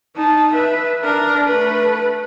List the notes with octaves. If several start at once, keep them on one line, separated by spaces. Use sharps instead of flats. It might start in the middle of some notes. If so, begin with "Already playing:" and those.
D#4 A5
B4 E5
D4 A#4
A3 B4